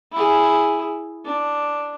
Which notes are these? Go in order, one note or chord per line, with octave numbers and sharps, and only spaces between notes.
E4 G#4
D4